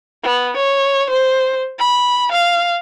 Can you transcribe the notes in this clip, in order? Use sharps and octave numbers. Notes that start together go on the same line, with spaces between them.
B3
C#5
C5
B5
F5